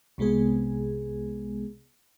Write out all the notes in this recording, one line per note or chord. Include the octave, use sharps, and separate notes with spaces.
C2 C3 G#3 B3 G#4